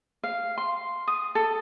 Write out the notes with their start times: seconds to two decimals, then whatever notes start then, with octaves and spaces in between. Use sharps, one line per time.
0.23 F5
0.58 C6
1.08 D#6
1.35 A4